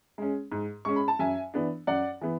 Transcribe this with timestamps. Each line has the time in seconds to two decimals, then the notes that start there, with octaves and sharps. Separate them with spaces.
0.18 G#3 C#4
0.52 G#2
0.85 G#3 C#4 C#6
0.96 B5
1.08 A5
1.19 F#2 E5 G#5
1.54 E3 B3 D4
1.87 F#2 D5 F#5
2.21 E3 B3